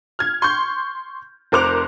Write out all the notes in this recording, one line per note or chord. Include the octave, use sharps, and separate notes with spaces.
F6 G#6
C6 C#6 G6
F1 A#4 C5 D6 F#6 F7